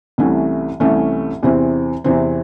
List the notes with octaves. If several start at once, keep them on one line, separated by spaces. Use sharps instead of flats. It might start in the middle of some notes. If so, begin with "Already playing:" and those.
C2 C3 E3 A3 C#4
C2 C3 E3 A3 C#4
E2 C3 E3 C4
E2 C3 E3 C4